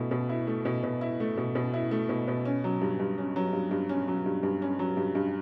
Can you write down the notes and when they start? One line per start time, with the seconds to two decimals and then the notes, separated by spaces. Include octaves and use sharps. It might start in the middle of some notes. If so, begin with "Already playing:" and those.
Already playing: B2 A3 E4
0.11 B2
0.29 E4
0.47 A3
0.65 B2
0.83 B2
1.01 E4
1.20 A3
1.38 B2
1.55 B2
1.74 E4
1.91 A3
2.09 B2
2.28 B2
2.45 C#4
2.64 F#3
2.82 G2
2.99 G2
3.18 C#4
3.36 F#3
3.53 G2
3.71 G2
3.89 C#4
4.08 F#3
4.26 G2
4.43 G2
4.62 C#4
4.79 F#3
4.97 G2
5.15 G2